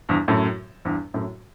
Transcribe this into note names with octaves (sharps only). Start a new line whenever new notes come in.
E2 G2
F#2 A2
E2 G2
F#2 A2